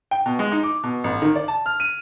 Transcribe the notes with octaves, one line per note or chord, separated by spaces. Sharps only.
G5
B2
G#3
D#4
D6
B2
A1
D#3
D5
A5
F6
D#7